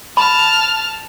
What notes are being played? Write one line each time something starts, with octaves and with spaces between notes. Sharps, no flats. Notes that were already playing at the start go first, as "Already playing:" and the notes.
A5 B5 F6